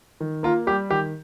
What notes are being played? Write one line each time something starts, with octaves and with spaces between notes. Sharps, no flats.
D#3
A#3 F4 A#4
G3 G4
D#3 G4